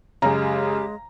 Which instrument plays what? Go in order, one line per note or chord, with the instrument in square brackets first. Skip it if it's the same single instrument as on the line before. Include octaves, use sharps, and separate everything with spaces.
[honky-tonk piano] F#2 C#3 [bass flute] G#3 [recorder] G4 [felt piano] A#5